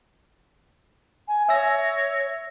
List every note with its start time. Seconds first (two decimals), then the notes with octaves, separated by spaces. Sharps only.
1.27 G#5
1.49 C#5 E5 E6 A#6